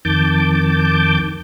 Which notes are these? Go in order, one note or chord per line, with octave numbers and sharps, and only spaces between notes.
F2 D#3 A5 D6 G6